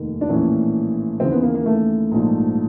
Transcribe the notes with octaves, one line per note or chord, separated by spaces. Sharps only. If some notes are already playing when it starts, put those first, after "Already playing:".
Already playing: F1 D#2 D#3
D4
A#1 A2 E3 C#4
D#2 C#3 E3 C4
B3
A#3
A#3
A3
A#1 G#2 F3